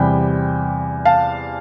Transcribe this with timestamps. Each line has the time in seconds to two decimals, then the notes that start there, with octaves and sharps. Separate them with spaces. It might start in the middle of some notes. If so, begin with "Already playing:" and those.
Already playing: E2 C3 G3 G5 B5
1.05 F5 A5